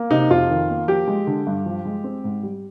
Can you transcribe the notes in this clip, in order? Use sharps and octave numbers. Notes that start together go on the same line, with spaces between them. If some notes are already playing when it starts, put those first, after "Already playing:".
Already playing: A#3
C3 D#4
F2 F4
D#3
A#3
F3 G4
G#3
D3
G2
F3
G#3
C4
G#2
G3